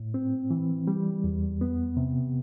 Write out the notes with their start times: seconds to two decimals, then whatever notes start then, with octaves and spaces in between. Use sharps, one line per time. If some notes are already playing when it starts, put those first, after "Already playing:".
Already playing: A2
0.14 C4
0.51 E3
0.88 G3
1.24 E2
1.61 B3
1.97 C3